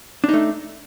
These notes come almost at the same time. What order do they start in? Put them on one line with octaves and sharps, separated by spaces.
D4 D#4 A3